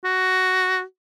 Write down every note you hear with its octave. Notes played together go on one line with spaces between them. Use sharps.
F#4